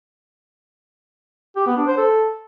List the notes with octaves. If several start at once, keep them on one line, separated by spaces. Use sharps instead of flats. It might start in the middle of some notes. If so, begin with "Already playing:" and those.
G4
B3
D4
C5
A4